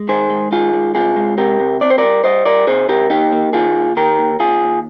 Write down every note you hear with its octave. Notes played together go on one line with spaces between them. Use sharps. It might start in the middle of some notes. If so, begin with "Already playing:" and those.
Already playing: G#3
D#3 G#4 C5
G#3
D#3 F4 G#4
G#3
C3 F4 G#4
G#3
C3 G4 A#4
C3
C4 D5
C5
G3 A#4 D5
G3 C5 D#5
G3 A#4 D5
C3 G#4 C5
C3 G4 A#4
D#2 D#4 G4
A#3
D#3 F4 G#4
D#2
D#3 G4 A#4
D#2
D#2 F4 G#4
D#2